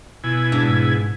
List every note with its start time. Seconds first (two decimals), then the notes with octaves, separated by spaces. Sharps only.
0.24 B2 E4 G#5
0.52 G#2 D4